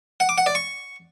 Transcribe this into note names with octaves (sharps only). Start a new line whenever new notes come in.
F#5
D6
F#5
D5
C#6